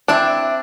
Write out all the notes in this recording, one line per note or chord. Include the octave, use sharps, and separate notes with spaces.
C4 D4 E4